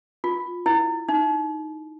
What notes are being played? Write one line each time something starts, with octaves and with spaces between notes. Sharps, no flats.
F4
E4
D#4